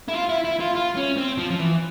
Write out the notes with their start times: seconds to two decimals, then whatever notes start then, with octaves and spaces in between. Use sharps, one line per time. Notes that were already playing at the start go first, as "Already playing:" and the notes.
0.09 E4
0.14 F4
0.29 E4
0.45 E4
0.60 F4
0.75 F4
0.97 C#4
1.17 C4
1.38 F3
1.50 F3
1.59 E3